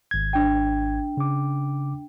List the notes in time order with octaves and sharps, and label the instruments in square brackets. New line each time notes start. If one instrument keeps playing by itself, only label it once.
[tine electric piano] G#1 G#6
[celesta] D4 G5
[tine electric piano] C#3 D6